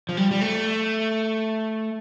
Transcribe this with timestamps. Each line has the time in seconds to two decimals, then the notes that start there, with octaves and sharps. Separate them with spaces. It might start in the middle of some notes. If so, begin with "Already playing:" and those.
0.09 F3
0.17 G3
0.31 G3
0.41 A3